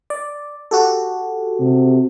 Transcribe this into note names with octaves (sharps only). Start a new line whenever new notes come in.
D5
F#4 G4 A4
C3